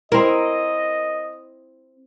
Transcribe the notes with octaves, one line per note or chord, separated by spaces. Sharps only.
C4 E4 A#4 D#5